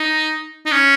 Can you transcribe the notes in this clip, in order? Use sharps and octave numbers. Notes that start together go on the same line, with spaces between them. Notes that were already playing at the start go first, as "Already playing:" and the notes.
Already playing: D#4
D#4
C#4